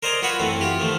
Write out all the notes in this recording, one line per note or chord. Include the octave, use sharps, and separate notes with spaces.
A#4 C5 D5 D#5 G#5 A#5
F4 F#4 B4 F#5 G#5 B5
F#2 E3 A3 C4
F4 G4
D#3 F3 A3